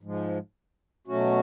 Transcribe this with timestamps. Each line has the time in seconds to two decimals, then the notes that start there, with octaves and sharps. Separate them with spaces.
0.01 G#2 F3 G#3
1.07 B2 F#3 A3 C#4 F#4